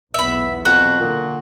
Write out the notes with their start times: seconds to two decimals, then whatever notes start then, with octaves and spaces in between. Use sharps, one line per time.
0.14 B1 E2 B3 E5 B5
0.65 F2 F#4
1.00 A#2 D3